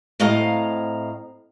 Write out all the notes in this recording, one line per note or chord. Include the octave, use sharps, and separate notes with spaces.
A2 C4 D#5 F5 A#5